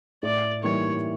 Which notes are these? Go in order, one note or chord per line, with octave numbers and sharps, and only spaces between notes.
A2 D5
E3 G3 A#3 D#4 C#5